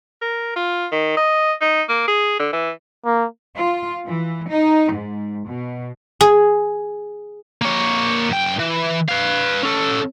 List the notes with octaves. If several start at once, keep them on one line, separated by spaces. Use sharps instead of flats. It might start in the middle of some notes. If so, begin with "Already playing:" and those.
A#4
F4
D#3
D#5
D#4
A#3
G#4
D3
E3
A#3
F4
E3
D#4
G#2
B2
G#4
A#3 C#5
F#2 G5
E3
B4 F5
C#4 A4